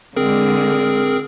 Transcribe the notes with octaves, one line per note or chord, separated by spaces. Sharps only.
D3 G#3 C4 G#4 A#4